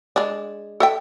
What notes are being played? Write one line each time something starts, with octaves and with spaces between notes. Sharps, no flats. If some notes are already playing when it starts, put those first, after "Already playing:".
G#3 D4
A4 E5 G5